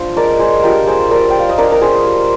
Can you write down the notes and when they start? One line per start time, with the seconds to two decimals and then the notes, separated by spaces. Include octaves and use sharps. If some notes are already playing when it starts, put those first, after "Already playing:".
Already playing: D4 F4 C5
0.16 G#3 A#4 D5
0.39 G#4 C5
0.63 D4 F4 G4 A#4
0.87 G#4 C5
1.10 G3 A#4 D5
1.30 G5
1.39 F5
1.49 D#5
1.58 D4 F4 A#4 D5
1.72 A#4
1.82 G#4 C5
2.05 G3